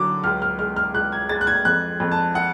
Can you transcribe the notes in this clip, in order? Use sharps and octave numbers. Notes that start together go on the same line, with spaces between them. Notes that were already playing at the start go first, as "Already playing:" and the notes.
Already playing: D3 F#3 D6
C#2 F6
F6
G#3 F6
F6
C#2 F#6
G#6
G#3 A6
F#6
G#6
F2 F#6
F2
A5
F#5